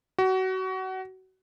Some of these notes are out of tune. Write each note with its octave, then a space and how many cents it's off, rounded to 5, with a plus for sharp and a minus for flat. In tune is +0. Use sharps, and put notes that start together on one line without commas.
F#4 +25